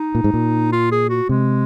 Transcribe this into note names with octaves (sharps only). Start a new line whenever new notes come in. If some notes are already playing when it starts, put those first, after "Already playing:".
Already playing: D#4
A#2
G#2
A#2
F4
G#4
F#4
C3 G#3